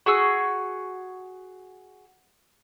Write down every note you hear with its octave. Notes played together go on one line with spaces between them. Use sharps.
F#4 G#4 C#6 E6